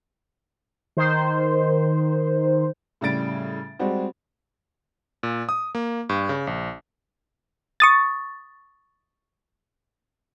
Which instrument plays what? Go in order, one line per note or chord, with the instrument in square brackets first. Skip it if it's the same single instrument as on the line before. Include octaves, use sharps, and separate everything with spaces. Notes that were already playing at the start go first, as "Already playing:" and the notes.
[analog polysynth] D#3 C5
[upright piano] A2 C#3 G3 A6 D7
G3 G#3 C4 F#4
[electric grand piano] A#2
D#6
A#3
G2
C#3
A#1
[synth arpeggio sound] C#6 D#6 A6